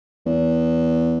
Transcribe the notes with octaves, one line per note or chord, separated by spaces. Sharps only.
E2